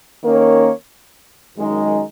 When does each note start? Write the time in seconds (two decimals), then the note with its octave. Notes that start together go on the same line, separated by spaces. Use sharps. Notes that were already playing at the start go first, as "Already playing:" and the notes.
0.23 D#3 A#3 C#4 A#4 C#5
1.56 F#2 D#3 G#3 D#4